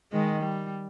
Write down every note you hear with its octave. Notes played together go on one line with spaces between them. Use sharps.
D#3 G#3
G3